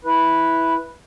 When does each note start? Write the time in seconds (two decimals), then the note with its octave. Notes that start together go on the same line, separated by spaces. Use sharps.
0.05 E4 B4